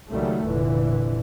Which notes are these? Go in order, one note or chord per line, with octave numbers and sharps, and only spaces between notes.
C#2 D#3 F#3 G3 A3
F1 A#2 D3 E3